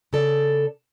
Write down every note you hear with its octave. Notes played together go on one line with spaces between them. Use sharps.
C#3 A4 D5